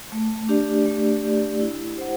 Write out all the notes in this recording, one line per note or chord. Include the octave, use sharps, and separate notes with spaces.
A3
D4 G4 D5
A3
D4 G4 D5
E4
G4 C5 F#5